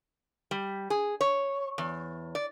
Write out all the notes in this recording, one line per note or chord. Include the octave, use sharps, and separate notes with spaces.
G3
G#4
C#5
E2
D5